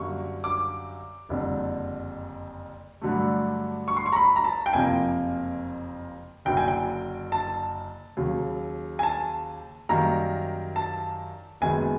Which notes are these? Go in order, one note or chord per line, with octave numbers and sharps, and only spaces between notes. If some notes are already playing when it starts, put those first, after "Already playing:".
Already playing: F#2 D3 G3 A#3 C#6
D6
F#1 F2 D3 G3
G2 D3 F#3 A3
C#6
C6
C#6
A#5
B5
A#5
A5
G5
F#1 F2 C3 F3 A#3 G#5
F#1 F#2 D3 G5
G#5
G5
A5
D#2 C#3 F#3
G#5
A5
F#2 D#3 G3 A#3 A#5
A5
F#1 F#2 D#3 G#3 B3 G#5